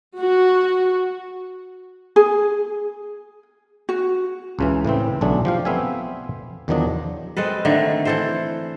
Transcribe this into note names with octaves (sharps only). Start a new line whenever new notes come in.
F#4
G#4
F#4
C#2 C#3 E3
A2 C#3 E3 C4
B1 D3 F#3 A3 D4 G#4
F3 G4 F5
A3 B3 C4 E5 F5 G#5
E2 D#3 F3 F#3 D4 D#5
G#3 C4 A4 B4
D3 D#3 A3
E3 A4 C5